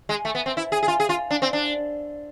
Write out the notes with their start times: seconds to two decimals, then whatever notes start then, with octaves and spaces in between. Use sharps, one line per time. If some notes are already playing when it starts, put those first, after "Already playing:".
0.09 G#3
0.25 A3
0.35 B3
0.46 C4
0.57 E4
0.72 G#4
0.83 G#4
0.88 F4
1.00 G#4
1.09 F4
1.31 D4
1.42 C4
1.53 D4